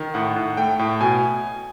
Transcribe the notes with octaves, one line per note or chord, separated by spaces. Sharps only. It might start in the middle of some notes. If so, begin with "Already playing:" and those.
Already playing: D#3
A2 F#5
A2
A3 G5
A2
B2 G#5